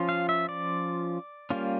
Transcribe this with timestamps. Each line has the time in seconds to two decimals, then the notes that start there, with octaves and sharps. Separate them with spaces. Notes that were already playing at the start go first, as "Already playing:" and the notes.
Already playing: F3 C#4 F4
0.09 F5
0.29 E5
0.49 D5
1.50 G3 A#3 C#4 F4